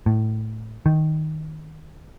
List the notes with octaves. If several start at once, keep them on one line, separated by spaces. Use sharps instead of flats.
A2
D#3